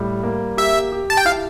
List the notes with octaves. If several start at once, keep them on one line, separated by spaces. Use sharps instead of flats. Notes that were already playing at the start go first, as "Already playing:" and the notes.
Already playing: A2 G3
A#3
G4 E5
G4
A5
G5
E4 F5